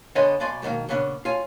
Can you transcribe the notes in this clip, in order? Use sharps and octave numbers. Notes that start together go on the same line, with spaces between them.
D3 B3 C#5 D#5 G#5 C6
B1 B2 D5 G#5 C6
G#2 B2 D3 D#3 A#3
A#2 C#3 B3 C#4 D4
F4 C#5 G#5